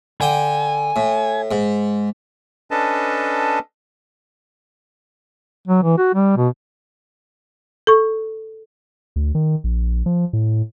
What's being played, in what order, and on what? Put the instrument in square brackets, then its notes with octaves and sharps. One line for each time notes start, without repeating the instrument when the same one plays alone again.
[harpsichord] D3 G5 [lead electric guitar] G#5
[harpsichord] A2
G#2
[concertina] C#4 D4 A4 B4 D#5 A5
[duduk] F#3
E3
F#4
G3
B2
[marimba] A4 C#6
[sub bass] D2
D#3
A#1
F3
A2